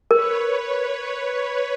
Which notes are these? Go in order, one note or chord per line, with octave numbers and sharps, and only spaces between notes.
A#4 B4 C#5